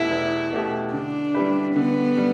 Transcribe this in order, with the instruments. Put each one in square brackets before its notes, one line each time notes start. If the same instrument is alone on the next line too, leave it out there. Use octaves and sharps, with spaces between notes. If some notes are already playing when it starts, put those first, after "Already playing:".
Already playing: [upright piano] E2 B2 A3 G4 [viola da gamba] E4
[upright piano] E2
B2 A3 G4
[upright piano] D3 [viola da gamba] D4
[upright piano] G3 E4 G4 B4
[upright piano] D3 [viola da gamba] B3
[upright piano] G3